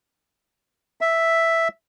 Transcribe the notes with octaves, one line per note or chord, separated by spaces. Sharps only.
E5